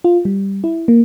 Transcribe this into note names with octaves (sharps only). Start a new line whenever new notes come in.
F4
G3
E4
A#3